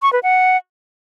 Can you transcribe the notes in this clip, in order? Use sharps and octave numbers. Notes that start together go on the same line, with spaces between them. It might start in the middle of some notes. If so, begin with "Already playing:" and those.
C#6
B4
F#5